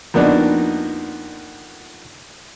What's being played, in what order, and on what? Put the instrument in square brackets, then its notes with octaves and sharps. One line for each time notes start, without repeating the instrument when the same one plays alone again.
[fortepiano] F2 A#3 B3 D4 D#4 F#4